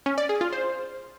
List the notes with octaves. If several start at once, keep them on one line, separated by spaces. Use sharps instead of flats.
C#4
D5
G#4
F4
C5